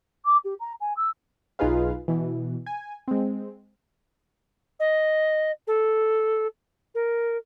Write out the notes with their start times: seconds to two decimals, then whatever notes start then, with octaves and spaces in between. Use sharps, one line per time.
0.25 D6
0.44 G4
0.60 A#5
0.81 G#5
0.97 E6
1.59 B1 D#4 F4 G#4 B4 F5
2.08 B2 E3
2.66 G#5
3.08 G#3 C4
4.79 D#5
5.67 A4
6.94 A#4